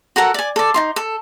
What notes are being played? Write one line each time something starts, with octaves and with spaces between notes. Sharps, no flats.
F#4 A4 A#4 F#5
D5 G#5
A4 D5
D#4 F4 C6
A4